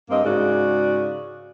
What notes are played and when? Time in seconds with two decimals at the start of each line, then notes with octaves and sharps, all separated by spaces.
0.10 G2 A#3 C4 D#5
0.24 G#2 C#3 F#4 D5